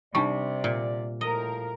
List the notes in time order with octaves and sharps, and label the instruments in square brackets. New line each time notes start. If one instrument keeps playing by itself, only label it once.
[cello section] C3 [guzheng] G3 [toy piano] D4 D#4 C#6 [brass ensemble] D5
[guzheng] A#2
[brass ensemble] A2 F3 [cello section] A#4 [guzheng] D#5